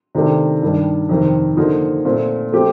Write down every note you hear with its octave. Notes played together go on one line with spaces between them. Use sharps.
C3 D#3 A3 D4 G4
G2 D#3 G3 D4
F2 C3 D#3
D3 F3 A#3 D#4
A#2 A3 C4
F3 A3 C4 G4